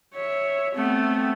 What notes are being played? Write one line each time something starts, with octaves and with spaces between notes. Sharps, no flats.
C#5 E5
A3 B3 C4